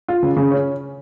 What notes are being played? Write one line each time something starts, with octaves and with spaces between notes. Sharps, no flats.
F4
C#3
C#3
C#4